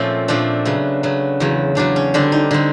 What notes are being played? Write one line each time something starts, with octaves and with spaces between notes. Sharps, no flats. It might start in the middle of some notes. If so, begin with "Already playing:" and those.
Already playing: A#2 F3 A3 C4 C#4
A#2 F3 A3 C4 D4
C#3 F#3 B3
C#3 F#3 B3
E2 C#3 F#3
E2 C#3 F#3 D4
C#4
D3 G3 C4 D4
D#4
D3 G3 C4